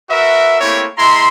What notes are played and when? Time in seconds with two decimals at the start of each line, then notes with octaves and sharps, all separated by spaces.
0.10 F#4 A#4 B4 E5
0.61 A3 A#3 C4 E4 G4 C#5
0.97 G#3 E4 A#5 C6